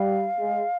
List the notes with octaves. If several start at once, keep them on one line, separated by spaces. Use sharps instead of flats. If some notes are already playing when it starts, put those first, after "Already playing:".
Already playing: G3 F5
G#3